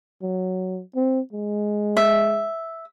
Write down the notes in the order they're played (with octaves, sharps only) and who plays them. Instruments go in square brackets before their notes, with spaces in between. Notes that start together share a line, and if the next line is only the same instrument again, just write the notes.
[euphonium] F#3
C4
G#3
[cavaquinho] E5